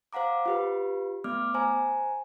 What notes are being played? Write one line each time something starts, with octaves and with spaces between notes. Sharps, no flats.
C5 F5 F#5 A#5 D6
F4 G4 B4
A3 B3 D6 F6
C5 G#5 A#5